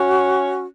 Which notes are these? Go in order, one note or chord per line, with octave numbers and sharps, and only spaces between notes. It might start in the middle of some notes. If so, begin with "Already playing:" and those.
Already playing: C#4 F#4